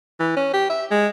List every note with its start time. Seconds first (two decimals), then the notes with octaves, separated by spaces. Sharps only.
0.20 E3
0.37 C#4
0.54 G4
0.70 E5
0.91 G#3